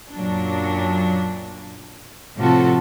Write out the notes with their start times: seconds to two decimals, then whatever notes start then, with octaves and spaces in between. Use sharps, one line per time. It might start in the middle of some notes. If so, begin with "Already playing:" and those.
0.12 F#2 A#2 F#3 D4
2.38 A2 C3 F3 F4 F#4 A4